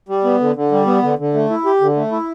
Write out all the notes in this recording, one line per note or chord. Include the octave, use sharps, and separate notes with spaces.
G3
B3
D3
D3
G3
B3
D3
D3
A3
E4
G4
D3
A3
E4